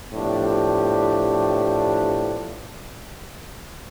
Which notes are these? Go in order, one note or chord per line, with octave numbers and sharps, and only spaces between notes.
A2 F3 B3 D4 G4